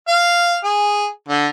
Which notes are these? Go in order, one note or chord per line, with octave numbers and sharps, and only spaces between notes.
F5
G#4
D3